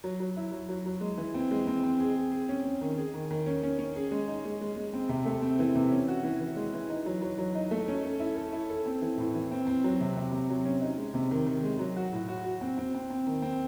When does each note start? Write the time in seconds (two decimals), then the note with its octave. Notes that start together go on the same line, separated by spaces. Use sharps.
0.04 F#3
0.20 F#3
0.37 E4
0.52 F#3
0.69 F#3
0.86 F#3
1.01 G#3
1.17 E3
1.34 C4
1.51 G#3
1.67 C4
1.83 C4
2.00 G#4
2.16 G#4
2.32 G#4
2.49 C#4
2.64 C#4
2.81 D#3
2.98 G#4
3.14 D#3
3.31 D#3
3.46 C#4
3.63 C#4
3.79 C#4
3.96 G#4
4.11 G#3
4.28 D#4
4.45 G#3
4.61 G#3
4.76 G#3
4.94 C4
5.09 C3
5.25 A3
5.42 C4
5.59 E3
5.75 C3
5.91 C#4
6.08 F#4
6.23 E3
6.40 E3
6.56 G#3
6.74 E3
6.90 D#4
7.06 F#3
7.21 F#3
7.38 F#3
7.55 D#4
7.71 A3
7.88 C#4
8.04 A4
8.20 E4
8.36 A4
8.53 E4
8.70 A4
8.86 C4
9.01 E3
9.18 A2
9.35 E3
9.51 C4
9.67 C4
9.84 F#3
10.00 C3
10.17 C3
10.32 C3
10.49 F#3
10.65 C#4
10.81 D#4
10.98 G#3
11.14 C3
11.31 D#3
11.46 D#3
11.64 G#3
11.79 F#3
11.96 F#4
12.12 A2
12.28 F#4
12.44 F#4
12.61 C4
12.78 C4
12.94 C4
13.10 C4
13.27 D#3
13.42 C4